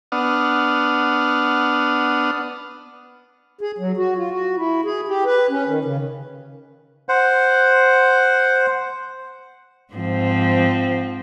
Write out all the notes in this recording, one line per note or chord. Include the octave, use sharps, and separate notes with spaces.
B3 D4 F#5 D#6 F6
G#4
F#3
F#4
F4
F#4
E4
G#4
G4
B4
C#4
D#3
C#3
C5 F#5
G#2 F3 C4